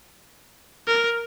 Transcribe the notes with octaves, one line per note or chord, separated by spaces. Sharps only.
A#4